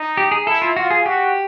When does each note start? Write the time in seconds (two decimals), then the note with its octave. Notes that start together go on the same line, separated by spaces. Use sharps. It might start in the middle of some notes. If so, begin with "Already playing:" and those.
Already playing: D#4
0.17 G4
0.31 G#4
0.46 E4 A4
0.62 F4
0.76 F4 F#4
0.91 G#4
1.05 F#4 G4